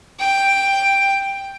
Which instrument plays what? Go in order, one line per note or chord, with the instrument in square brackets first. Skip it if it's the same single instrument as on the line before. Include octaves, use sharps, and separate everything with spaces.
[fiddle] G5